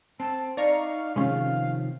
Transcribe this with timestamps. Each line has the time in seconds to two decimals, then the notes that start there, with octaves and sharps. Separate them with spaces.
0.20 C4 A5
0.57 D#4 D5 F5 A#5 C#6
1.16 C3 D#3 F3 G#3 C#4 F5